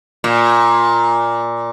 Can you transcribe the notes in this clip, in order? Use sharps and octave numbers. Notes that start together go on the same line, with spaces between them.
A#2